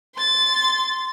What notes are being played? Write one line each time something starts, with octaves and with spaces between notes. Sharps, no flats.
C6 A6